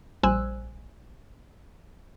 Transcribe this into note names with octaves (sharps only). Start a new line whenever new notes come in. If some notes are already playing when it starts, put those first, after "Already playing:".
A#1 G3 C5 G#5 E6 F#6